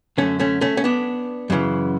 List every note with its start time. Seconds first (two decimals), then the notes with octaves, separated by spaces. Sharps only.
0.18 F#2 D3 A3 C#4
0.40 A3 C#4
0.61 A3 C#4
0.77 C#4
0.84 B3 D4
1.50 F#2 C#3 E3